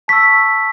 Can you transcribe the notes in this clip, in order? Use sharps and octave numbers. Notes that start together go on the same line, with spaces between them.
A5 C#6 E6 B6